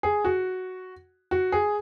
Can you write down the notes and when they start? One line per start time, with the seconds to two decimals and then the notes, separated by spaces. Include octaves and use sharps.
0.03 G#4
0.25 F#4
1.31 F#4
1.52 G#4